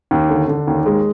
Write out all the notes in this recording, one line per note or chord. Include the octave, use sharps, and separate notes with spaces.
D#2
D3
D3
D#2
G#3